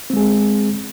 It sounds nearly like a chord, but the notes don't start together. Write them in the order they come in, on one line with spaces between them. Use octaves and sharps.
C4 G#3 G#4